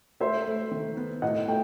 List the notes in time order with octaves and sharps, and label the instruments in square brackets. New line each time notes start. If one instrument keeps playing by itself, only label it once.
[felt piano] A3 [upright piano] C5 E5
[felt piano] A3
D#3
B3
[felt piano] A2 [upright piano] D#5 F#5
[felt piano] A3 [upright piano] G5